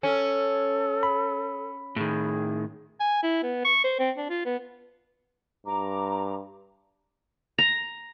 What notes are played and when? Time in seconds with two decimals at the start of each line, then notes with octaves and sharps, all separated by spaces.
0.03 C#4 A4
1.03 B5
1.96 A2 D#3 G#4
3.00 G#5
3.23 E4
3.43 B3
3.65 C#6
3.84 C5
3.99 C4
4.17 D4
4.29 F4
4.45 B3
5.66 G2 A#5 D6
7.58 A#5